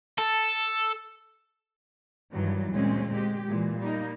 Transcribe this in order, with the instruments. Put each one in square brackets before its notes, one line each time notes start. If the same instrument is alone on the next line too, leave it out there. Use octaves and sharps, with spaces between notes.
[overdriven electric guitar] A4
[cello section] G2 D#3 E3 F#3 G3
D2 A#2 G#3 C4 C#4
G#3 G4
A#2 E3 G#3
G3 A#3 D#4